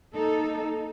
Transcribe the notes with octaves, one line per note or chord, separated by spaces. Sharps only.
A#3 D#4 A4